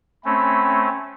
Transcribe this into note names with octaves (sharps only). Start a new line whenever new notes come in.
A3 C4 C#4 B5